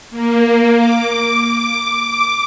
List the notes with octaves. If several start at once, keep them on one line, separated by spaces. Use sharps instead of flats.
A#3
D6